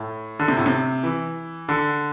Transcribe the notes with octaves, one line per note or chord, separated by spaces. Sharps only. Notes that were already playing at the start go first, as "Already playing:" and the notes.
Already playing: A2
D3
C3
A2
C3
E3
D3